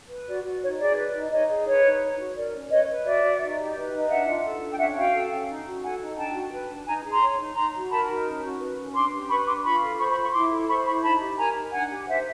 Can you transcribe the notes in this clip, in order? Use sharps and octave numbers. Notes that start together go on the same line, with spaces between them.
B4
F#4 D5
F#4
D#4 C#5
G#4 D5
B4
D#4
D#4 C#5 D#5
G#4
B4 C#5
D#4
C#5
F#4
A#4 D5
C#4
B4 C#5 D#5
B4
F#4 D5 E5
F#4
D#4
G4
B4
D#4
D4 E5 F#5
F4
A4
D4
G5
C#4 E5 F#5
F#4 F5 G5
A4
C#4
D#4
F#4
A4 F#5 G#5
D#4
D4 G5 A5
F#4
B4
D4
D#4 G#5 A#5
G#4
A#5 C6
C#5
D#4
D#4 A#5 C6
F#4
A#4 A5 B5
D#4
C#4
F#4
B4
C#4
D4 C6 D6
G4
B4 B5 C#6
D4 C6 D6
F4 B5 C#6
A4
C5 B5 C#6
B5 C#6
F4
B5 C#6
E4 C6 D6
A4
C5 B5 C#6
E4 B5 C#6
D#4 A5 B5
G4
A#4 G#5 A#5
D#4
D4 F#5 G#5
G4
C5 E5 F#5